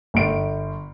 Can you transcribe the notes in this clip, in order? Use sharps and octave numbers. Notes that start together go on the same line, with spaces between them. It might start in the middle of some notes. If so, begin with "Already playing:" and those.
G1 D7